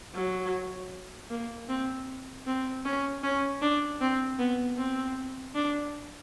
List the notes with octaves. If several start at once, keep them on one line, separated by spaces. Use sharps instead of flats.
F#3
A#3
C4
C4
C#4
C#4
D4
C4
B3
C4
D4